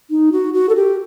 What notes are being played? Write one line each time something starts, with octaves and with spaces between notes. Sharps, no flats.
D#4
F#4
F#4
A4
G4